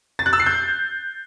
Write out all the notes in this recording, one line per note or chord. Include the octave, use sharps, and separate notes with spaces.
A6
F#6
E6
C7
G6